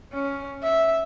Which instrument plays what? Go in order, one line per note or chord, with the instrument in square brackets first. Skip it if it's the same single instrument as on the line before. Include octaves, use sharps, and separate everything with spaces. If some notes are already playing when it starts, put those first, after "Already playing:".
[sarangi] C#4
E5